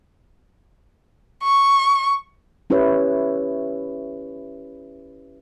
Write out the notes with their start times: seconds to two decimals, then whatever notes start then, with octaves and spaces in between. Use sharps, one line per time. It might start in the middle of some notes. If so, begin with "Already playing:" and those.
1.44 C#6
2.70 C#4 E4 G4 B4 C#5